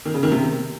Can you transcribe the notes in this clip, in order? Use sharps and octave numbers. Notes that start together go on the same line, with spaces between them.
D#3
C#3
D#3
C3